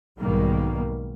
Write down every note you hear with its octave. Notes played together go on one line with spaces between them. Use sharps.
B1 G#2 B2 D#3 G3 A#3